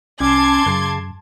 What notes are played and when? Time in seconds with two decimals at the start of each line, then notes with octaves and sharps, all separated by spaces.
0.21 C2 C#4 A5 C6 D6 G#6
0.66 F#2 C#3